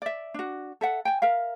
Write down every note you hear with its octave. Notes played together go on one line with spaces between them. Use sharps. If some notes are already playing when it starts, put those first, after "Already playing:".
D5 E5
D4 F#4
A4 E5 F#5
G5 G#5
A#4 E5 F5